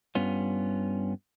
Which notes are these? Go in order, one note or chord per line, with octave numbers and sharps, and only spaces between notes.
G2 G3 B3 C#4 F4